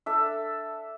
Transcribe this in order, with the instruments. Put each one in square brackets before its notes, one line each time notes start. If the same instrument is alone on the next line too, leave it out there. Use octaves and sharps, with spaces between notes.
[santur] D4 A4 E5